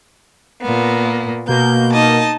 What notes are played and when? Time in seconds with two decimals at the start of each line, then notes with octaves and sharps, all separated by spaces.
0.60 A#2 A#3 B3
1.47 B2 A#3 G6
1.93 D#4 D#5 A5